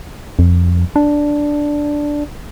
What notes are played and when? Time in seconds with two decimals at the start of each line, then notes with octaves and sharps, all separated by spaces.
0.39 F2
0.96 D4